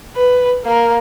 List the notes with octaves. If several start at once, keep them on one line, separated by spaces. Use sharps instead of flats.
B4
A#3 A#4